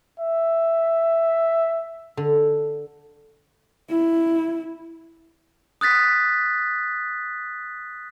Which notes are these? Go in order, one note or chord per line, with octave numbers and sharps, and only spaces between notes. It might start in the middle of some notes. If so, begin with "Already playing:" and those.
E5
D3
E4
D#6 F#6 A6 B6